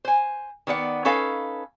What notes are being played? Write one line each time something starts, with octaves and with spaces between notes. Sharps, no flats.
C5 G#5
D#3 B3 D5 F#5
C#4 D#4 A4 B4 F5